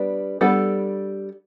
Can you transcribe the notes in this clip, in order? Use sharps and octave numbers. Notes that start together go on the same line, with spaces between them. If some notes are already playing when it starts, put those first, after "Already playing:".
Already playing: G3 B3 D4
G3 B3 D4 A4